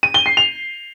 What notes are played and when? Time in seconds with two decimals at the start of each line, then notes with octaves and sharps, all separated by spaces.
0.03 D#7
0.14 G7
0.26 C7
0.37 F7